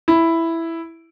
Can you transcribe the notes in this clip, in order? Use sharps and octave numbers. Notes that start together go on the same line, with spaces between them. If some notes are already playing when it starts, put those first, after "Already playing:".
E4